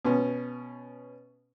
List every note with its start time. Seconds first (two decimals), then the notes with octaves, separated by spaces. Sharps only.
0.05 B2 B3 C#4